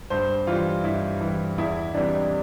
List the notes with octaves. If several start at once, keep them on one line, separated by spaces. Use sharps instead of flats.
G2 C5
E3 G3 F4
G2 E4
E3 G3
E2 E4
C3 E3 G3 D4